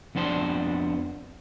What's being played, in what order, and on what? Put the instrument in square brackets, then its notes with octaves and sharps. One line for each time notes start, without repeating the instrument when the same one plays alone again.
[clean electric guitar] F2 B3 D4 C5 A5